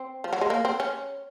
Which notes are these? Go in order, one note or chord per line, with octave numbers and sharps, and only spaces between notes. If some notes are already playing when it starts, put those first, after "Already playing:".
Already playing: C4
F3
F#3
G#3
A#3
C4
C#4